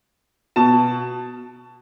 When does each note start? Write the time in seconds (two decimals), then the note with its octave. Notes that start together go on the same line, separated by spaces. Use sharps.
0.56 B2 A5